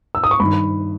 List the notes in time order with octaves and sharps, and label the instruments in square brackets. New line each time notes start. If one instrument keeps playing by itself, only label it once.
[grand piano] E6
D#6
C#6
G2 D#3 B5